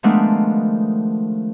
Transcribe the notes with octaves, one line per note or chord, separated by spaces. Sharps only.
D#3 F3 G#3 A3 B3 D4